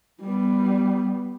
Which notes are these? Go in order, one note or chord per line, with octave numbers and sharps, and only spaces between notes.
G3 B3